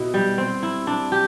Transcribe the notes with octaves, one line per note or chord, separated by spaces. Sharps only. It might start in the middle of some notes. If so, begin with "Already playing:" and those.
Already playing: B2 E4
G3
C4
E4
D4
G4